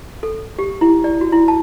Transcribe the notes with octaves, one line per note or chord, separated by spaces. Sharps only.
A4
G4
E4
D5
F#4
E4
A5